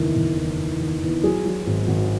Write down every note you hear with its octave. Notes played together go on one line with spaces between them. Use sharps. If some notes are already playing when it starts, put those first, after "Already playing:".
Already playing: F#1 E2 D#3 E4
F#1
E2
E2
D#3
E2
F#3 G#4
F#3
G#1
G#1